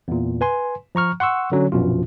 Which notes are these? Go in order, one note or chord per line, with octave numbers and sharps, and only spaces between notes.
E2 A#2
B4 G#5 C6
F3 A#5 C#6 F6
F#5 C6 C#6 E6
D3 F#3 C#4
A#1 F#2 B2 F4